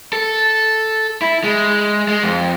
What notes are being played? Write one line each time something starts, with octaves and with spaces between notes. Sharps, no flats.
A4
E4
G#3
G#3
F2